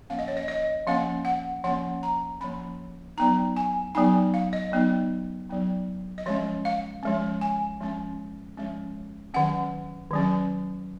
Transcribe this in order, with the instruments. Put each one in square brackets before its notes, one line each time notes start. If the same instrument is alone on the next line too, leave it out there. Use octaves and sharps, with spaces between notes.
[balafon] F3 A#3 C#4 F5
D#5
C#5
D#5
D#5
F3 A#3 C#4 F5
F#5
F3 A#3 C#4 F#5
A#5
F3 A#3 C#4 B5
F#3 B3 D#4 A#5
G#5
F#3 B3 D#4 G#5
F5
D#5
F#3 B3 D#4
F#3 B3 D#4
D#5
F3 G#3 C#4 C#5
F5
F3 G#3 C#4
G#5
F3 G#3 C#4
F3 G#3 C#4
D#3 F#3 C#4 F#5
D#3 F#3 C#4